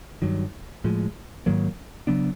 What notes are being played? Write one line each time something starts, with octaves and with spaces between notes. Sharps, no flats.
G2 D#3 F#3
A2 F3 G#3
G#2 D#3 F#3 A#3
C#3 F#3 B3 D4